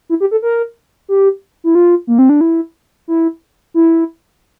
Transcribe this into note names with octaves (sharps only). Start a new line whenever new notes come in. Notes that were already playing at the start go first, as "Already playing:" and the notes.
E4
G4
A4
A#4
G4
E4
F4
A#3
C4
D4
E4
E4
E4